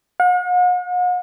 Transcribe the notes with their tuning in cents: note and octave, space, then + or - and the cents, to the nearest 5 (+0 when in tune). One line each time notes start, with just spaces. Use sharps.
F#5 -45